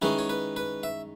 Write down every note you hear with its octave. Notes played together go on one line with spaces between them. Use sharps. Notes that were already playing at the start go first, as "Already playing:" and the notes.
D#3 G#3 C#4 E4 B4
C#5
B4
B4
E5